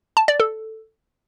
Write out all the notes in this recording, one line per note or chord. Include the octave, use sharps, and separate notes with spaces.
A5
D5
A4